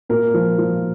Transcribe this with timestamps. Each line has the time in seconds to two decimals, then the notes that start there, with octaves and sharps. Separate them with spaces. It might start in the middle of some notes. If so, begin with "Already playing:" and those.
0.09 A#2 A#4
0.34 F3
0.58 F3